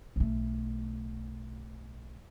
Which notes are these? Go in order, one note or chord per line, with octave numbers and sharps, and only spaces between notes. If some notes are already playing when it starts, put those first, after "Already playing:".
B1 A3